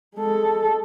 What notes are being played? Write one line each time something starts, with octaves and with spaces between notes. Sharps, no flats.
G#3 A4